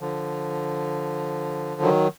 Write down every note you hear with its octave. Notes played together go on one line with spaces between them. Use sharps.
D3 F3
D#3 F#3